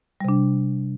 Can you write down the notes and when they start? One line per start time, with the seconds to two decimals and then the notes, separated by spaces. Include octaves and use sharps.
0.21 G3
0.25 C3
0.29 D4